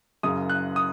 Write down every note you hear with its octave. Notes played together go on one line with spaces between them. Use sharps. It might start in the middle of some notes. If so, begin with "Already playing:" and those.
F#1 F#2 C#3 D#6
F#6
D#6